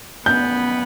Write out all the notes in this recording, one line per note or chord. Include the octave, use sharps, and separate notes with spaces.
B3 G6